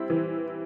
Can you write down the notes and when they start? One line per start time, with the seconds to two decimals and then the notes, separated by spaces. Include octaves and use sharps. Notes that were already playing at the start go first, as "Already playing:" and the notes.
Already playing: G3 C4 E4
0.10 E3